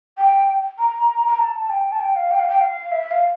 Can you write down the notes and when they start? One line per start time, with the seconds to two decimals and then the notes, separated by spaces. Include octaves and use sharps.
0.18 G5
0.78 A#5
1.28 A#5
1.39 A5
1.70 G5
1.92 A5
2.00 G5
2.16 F5
2.31 G5
2.40 F5
2.49 G5
2.61 F5
2.92 E5
3.11 F5